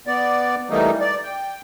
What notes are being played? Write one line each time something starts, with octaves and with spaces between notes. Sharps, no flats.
B3 D5
E3 G3 A3 A#3 D#4
D5
G5